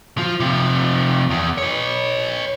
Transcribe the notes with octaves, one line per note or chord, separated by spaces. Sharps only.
F3 F4
C3 F3
E2
B4 C#5